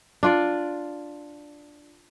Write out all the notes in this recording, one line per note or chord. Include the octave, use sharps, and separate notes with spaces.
D4 F4 D5